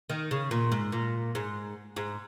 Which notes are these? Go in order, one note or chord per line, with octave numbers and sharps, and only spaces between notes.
D#3
C#3
A#2
G#2
A#2
G#2
G#2